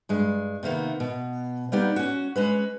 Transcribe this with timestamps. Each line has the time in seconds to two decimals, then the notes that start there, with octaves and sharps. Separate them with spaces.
0.09 G2 G#3
0.63 C3 D#3 A#3 B3
1.00 B2
1.72 G3 A#3 B3 D#4 G4
1.96 C#4 F#4
2.36 G#3 C#4 B4